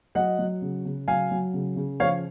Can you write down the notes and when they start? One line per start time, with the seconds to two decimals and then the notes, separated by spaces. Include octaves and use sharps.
0.15 F#3 D#5 F#5
0.39 F#3
0.62 C#3
0.85 C#3
1.08 F#3 F5 G#5
1.31 F#3
1.53 C#3
1.76 C#3
2.00 F3 C#5 F5